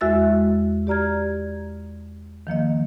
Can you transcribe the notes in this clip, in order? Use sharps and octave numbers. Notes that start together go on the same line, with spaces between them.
E2 G#3 F#4 E5 E6 A6
G4 D5 A#5 F6 G#6
D#3 F3 A#3 D#5